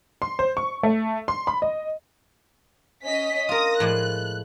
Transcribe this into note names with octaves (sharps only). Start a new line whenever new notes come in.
C6
C5
C#6
A3
C6
B5
D#5
C#4 D#5 B6
F4 A#4 D#6 A#6
A2 F3 G#3 F#6